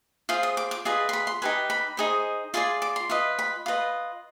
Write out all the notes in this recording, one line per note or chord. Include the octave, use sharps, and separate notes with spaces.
F4 G#4 C5 F5
D#6
D6
D6
F4 G#4 B4 D#5
C6
B5
C6
D#4 G4 B4 G#5
B5
D#4 G#4 C5
F4 G#4 D5 C6
D6
C6
F4 B4 D#5
B5
F4 B4 D#5